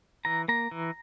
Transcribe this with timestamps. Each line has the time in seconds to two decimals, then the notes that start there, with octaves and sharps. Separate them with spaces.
0.25 E3 A#5
0.48 A#3 A#5
0.71 E3